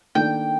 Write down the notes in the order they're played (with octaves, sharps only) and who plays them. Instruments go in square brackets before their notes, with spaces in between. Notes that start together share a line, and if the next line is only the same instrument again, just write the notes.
[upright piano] D#3 A#3 D4 A4 D5 [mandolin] G5